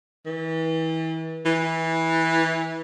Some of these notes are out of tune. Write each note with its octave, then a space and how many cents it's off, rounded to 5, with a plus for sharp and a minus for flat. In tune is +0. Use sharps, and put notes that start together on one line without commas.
E3 -35
E3 -15